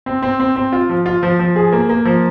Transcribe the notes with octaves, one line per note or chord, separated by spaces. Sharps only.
C4
C4
C4
C4
F4
F3
F4
F3
F3
G#4
A#3
A#3
F3